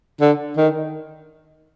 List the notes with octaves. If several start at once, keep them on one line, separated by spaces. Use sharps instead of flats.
D3
D#3